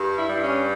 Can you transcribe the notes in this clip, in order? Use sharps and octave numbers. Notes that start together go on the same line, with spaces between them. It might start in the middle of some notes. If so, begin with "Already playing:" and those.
Already playing: G2 G3
E4
G2 E4
C#4